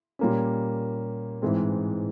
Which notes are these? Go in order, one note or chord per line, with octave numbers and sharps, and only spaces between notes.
A#2 G3 A#3 C#4
A1 G#2 E3 G#3 C4